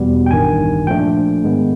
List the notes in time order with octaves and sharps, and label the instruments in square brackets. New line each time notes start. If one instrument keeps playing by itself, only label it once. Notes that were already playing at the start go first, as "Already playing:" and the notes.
Already playing: [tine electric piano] E2 B2 G3 B3
G5
A1 G2 D#3 G#5
A#2 F3 A3 D4 G5
G#2 D#3 G#3 B3